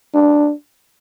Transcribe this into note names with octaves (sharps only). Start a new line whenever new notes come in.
D4